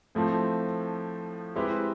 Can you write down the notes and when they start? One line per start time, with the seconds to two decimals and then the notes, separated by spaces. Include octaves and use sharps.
0.15 A2 F3 A3 C4
1.55 G#3 C4 E4 G4 B4